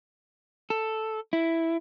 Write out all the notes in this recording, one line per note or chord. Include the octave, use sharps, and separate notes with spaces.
A4
E4